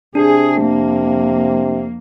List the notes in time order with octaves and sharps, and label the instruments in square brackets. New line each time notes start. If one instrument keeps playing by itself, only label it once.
[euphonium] C3 [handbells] D4 [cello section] G#4
[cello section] F2 A#3